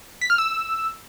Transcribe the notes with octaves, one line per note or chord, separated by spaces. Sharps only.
B6
F6
E6